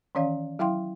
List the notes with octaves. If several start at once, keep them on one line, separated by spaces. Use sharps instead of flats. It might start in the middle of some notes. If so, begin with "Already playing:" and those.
D#3 E3 C#4 C#5 D5 F5
F#3 E4 F5 G5 C6